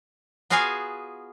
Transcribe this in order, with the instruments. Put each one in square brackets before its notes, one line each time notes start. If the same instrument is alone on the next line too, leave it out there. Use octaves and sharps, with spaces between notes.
[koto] B3 F4 F#4 G#4 F5 G#5